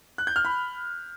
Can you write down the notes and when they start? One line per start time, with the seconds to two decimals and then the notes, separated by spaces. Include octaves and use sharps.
0.18 F#6
0.27 G6
0.36 F6
0.45 B5